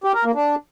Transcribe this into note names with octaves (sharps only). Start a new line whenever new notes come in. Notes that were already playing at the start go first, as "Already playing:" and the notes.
G4
A#4
A#3
D4